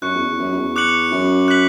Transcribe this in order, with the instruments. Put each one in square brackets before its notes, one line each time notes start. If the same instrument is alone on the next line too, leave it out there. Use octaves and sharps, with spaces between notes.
[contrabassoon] F#2 [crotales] C#6 F#6 C#7
[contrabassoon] E2
E2
F#2
F#2
E2
[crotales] D6 F#6 C#7 F#7
[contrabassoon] F#2
[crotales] F#6 B6 F#7